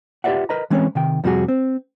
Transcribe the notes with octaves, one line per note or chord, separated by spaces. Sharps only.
F4 G4 B4 D5 E5 F#5
A#4 B4 D#5 A#5
E3 G#3 C4 C#4 B4 C#5
C3 D#3 G5
F2 C3 G3 D#4 F#4 G#4
C4